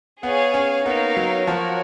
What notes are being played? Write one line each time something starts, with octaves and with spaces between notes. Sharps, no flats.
B3 G#4 C#5 F5 G#5
C#4
A#3 B3 D#4 A#4 C#5 F5
F#3
F3 F#4 A#4 C#5